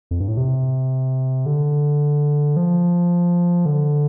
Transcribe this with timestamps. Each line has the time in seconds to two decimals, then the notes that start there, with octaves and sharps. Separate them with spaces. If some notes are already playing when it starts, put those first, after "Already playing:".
0.11 F2
0.20 G2
0.28 A2
0.37 C3
1.46 D3
2.56 F3
3.66 D3